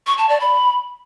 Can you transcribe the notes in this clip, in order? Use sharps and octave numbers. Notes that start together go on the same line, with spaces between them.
C#6
A5
D5
B5